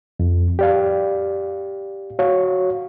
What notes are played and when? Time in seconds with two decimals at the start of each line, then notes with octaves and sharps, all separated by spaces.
0.20 F2
0.59 G4 D5 F5
2.19 F#4 C#5 F5